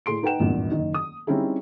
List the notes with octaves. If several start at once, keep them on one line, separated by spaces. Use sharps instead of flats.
A2 G#4 C6 D7
D#4 B4 F#5 G5 E7
G#1 E2 G2 A#2
F#1 D#3
D#6
G3 C4 C#4 D#4 E4 G#4